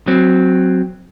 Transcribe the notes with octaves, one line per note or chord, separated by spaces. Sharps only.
F#3 C4